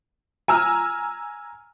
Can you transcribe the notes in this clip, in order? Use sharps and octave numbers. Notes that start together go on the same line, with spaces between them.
G#5 A#5 E6 F6